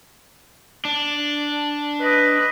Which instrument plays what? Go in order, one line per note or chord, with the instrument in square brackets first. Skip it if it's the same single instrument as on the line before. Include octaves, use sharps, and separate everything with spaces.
[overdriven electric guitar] D4
[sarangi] B4 [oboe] D#5